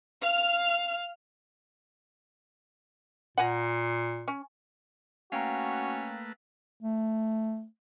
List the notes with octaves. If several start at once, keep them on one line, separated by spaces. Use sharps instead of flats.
F5 F6
A#2 F#5 G#5 A#5
C#4
A3 A#3 C#4 F#4 B4 F5 G5 A#5
A3